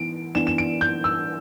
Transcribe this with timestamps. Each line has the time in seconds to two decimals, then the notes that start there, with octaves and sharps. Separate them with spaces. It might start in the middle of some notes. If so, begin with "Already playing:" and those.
Already playing: E3 B3 D7
0.35 E3 B3 D4 E7
0.47 E7
0.58 D7
0.81 G6
1.04 E6